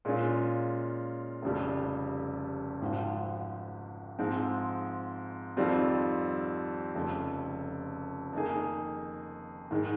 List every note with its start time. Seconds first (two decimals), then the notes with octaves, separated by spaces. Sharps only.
0.05 A#2 G#3 C#4 F4
1.42 F1 F2 C#3 G3
2.81 G#1 G#2 F3
4.19 G#2 F3 G#3 C4
5.57 F2 D#3 G3 C4 F4
6.95 F1 F2 C#3
8.33 F2 D#3 A#3 D#4 G#4
9.71 G#2 D#3 G#3